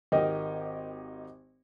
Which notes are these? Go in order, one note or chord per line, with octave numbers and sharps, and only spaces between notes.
G#1 D#4 G4 A#4 D#5